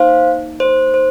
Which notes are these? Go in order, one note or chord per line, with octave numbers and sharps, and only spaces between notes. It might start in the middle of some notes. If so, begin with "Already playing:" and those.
Already playing: A#3 D#4 C5 F5
C5
C5